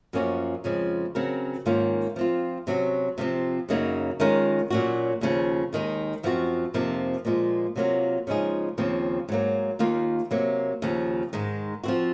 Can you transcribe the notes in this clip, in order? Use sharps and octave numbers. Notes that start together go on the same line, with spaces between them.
F#2 F3 A#3 C#4 F#4
F2 C#3 F3 G#3
C#3 F#3 C4 F#4 A#4
G#2 D#3 A#3 C#4 F4
F3 C4 F4
C3 F#3 C#4 F#4
C3 F3 C4
F#2 C#3 F#3 A#3 D#4
D#3 G#3 C#4 F4 A#4
A#2 F#3 C#4 F#4
D#2 C#3 F3
D#2 D#3 G#3 D#4
F#2 F3 C4 F#4
F2 C3 F3 A#3 D#4
A#2 F3 G#3
C3 F#3 A#3 F4 A#4
C#3 F3 G#3 D#4 G#4
D#2 C#3 F3 C4
G#2 F#3 A#3
D#2 D#3 A#3 F4
C3 F#3 A#3
D#2 C#3 F3
G#2 D#3 G#3
F3 C4 F#4